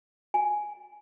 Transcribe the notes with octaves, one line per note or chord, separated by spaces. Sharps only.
G#5